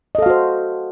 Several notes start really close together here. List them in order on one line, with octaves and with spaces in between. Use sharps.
D#5 A4 F5 F#4 C5